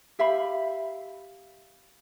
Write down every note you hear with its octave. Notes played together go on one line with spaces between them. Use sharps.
G4 E5 F5 B5